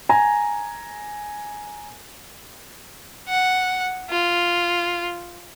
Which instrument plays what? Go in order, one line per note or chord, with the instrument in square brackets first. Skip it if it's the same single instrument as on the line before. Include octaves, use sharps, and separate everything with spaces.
[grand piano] G#5 A#5
[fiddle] F#5
F4